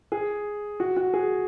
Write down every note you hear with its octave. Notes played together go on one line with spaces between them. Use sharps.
G#4
F#4
F#4
G#4